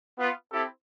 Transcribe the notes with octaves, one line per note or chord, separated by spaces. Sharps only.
B3 F4
C4 E4 G4 A4